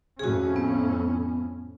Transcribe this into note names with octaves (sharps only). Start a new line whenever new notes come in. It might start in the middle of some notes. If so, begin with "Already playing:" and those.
F2 A2 C#4 F#4 G#4
B3